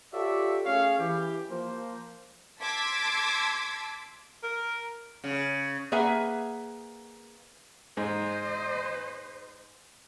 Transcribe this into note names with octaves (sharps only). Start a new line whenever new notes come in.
F4 G4 A4 C#5 D5 E5
A3 C#4 G#4 C#5 F5
E3 G4
F3 A#3 C5
A5 C6 D6 E6 G#6 B6
A#4
C#3
A#3 G#4 B4 E5 F#5 G#5
G#2 C5 D#5